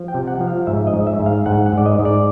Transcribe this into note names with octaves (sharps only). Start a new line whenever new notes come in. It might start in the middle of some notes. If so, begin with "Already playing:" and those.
Already playing: F3
G5
C3
F#5
F3
F5
G#2 E5
D#5
G#2
E5
G#2
F5
G#2 F#5
F#5
G#2 D5
D#5
G#2
D5